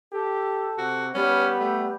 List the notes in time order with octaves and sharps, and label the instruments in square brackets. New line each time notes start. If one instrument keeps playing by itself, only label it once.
[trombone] G4 [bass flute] A4
[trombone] C3 [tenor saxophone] F#4
[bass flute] G3 [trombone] B3 [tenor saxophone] C#4
[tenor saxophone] A3